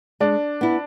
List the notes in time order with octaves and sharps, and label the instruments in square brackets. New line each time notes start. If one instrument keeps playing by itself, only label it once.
[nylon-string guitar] G#3 [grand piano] D4
[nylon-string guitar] B3 E4